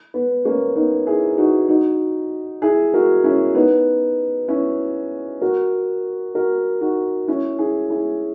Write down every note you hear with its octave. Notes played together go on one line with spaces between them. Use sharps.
B3
A#3 C#4
B3 D#4
E4 G#4
D#4 F#4
D#4 F#4
E4 G#4
F#4 A#4
C#4 E4
B3 D#4
C#4 E4
F#4 A#4
F#4 A#4
D#4 F#4
C#4 E4
E4 G#4
E4 G#4